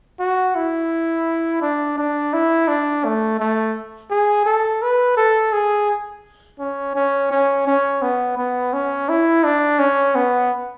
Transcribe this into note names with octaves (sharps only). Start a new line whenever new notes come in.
F#4
E4
D4
D4
E4
D4
A3
A3
G#4
A4
B4
A4
G#4
C#4
C#4
C#4
C#4
B3
B3
C#4
E4
D4
C#4
B3